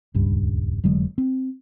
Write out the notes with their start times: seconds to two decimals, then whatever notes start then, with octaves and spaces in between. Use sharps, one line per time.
0.14 D#1 C#2 G2
0.84 F1 D3 F#3 G#3
1.18 C4